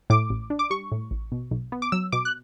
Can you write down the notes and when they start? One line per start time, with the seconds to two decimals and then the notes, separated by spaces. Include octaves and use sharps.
0.10 A2 D6
0.30 A1
0.50 D4
0.59 D6
0.70 G3 C#6
0.92 A2
1.11 A1
1.32 B2
1.51 B1
1.72 B3
1.82 D6
1.92 F#3 E6
2.12 B2 D6
2.25 F#6